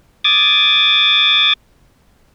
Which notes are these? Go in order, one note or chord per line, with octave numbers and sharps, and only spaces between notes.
D6 D#6 G#6 A6